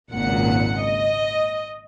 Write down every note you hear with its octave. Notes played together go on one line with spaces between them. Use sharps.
G#1 C#2 A#2 F#5 C#7
D#5